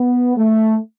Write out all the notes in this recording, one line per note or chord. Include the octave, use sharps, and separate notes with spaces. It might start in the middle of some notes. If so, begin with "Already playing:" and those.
Already playing: B3
A3